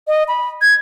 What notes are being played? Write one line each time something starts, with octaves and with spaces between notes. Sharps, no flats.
D#5
B5
G#6